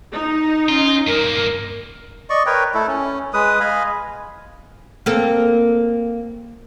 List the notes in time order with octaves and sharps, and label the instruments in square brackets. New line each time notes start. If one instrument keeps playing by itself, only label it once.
[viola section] D#4
[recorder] C#4 [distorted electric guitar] F4
[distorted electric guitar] G2 A#3 [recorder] A#4
[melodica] D5 D#5 C#6
A#4 B4 C#5 G5
A3 E4 A4
C#4
G#3 B4 D#6
D#5 F5 G#5 B5
[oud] A#3 C4 A4